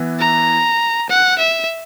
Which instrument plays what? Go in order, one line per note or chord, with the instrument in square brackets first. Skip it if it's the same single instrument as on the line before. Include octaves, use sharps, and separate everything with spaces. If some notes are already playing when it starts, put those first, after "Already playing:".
Already playing: [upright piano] E3 B3 E4
[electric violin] A#5
F#5
E5